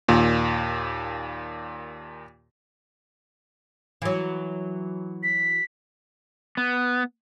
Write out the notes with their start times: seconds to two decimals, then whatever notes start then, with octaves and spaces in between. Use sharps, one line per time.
0.08 D#2 A#2
4.02 E3 F#3
5.23 B6
6.57 B3